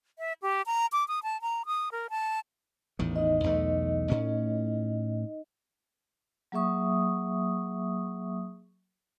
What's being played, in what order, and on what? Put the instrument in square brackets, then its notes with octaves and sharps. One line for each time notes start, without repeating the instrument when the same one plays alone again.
[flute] E5
G4
A#5
D6
D#6
A5
A#5
D#6
A#4
A5
[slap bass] A1 E2 D#3
[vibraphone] D#4 D#5
[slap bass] B1 E2 A3
A2 C#4
[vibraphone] F#3 A#3 G#4 E5 C#6 D#6